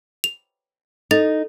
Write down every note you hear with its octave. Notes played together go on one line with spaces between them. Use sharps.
F7
D#4 A4 A6